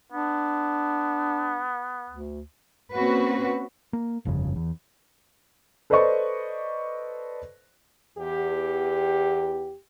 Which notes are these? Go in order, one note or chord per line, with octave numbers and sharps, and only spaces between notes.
B3 D4
D2
A#3 C4 C#4 F#4 B4
A#3
G1 F2 C#3
E2
A4 B4 C5 D5 D#5 C#6
E2 G4